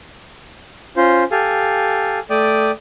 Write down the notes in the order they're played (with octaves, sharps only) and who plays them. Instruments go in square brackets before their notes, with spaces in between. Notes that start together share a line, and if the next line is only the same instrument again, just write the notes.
[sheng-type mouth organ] C#4 F4 C5
G4 A4 F5 G#5
A3 D5 G5 D#6